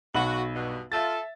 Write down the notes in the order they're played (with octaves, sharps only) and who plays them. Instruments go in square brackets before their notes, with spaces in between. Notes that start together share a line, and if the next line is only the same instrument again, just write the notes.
[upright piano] B1 B5 F#7 [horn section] F#4
[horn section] G2 B2
[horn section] F4 A4 [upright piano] E5 A6